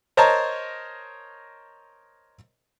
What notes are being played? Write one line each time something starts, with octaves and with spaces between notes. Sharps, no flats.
A#4 C5 C#5 D#5 A5 A#5